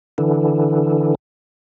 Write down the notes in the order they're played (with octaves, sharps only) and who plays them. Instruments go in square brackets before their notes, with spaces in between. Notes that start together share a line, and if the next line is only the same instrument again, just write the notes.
[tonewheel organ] D3 E3